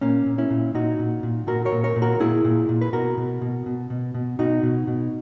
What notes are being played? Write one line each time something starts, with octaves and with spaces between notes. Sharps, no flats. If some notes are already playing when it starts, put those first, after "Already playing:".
A#2 A#3 C#4
A#2
C#4 E4
A#2
A#2 D#4 F#4
A#2
A#2
A#2 F#4 A#4
A#4 C#5
A#2
A#4 C#5
A#2
F#4 A#4
A#2 E4 G#4
A#2
A#2
B4
B2 F#4 A#4
B2
B2
B2
B2
B2
B2 D#4 F#4
B2
B2